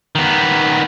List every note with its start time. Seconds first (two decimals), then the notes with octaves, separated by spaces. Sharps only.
0.15 D#3 B3